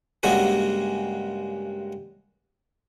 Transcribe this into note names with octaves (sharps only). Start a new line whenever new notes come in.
G2 C#3 G#3 A#3 F#4 G#4